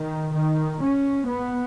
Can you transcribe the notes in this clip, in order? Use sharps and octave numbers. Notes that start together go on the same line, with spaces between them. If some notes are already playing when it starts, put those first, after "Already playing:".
Already playing: D#3
D#3
C#4
B3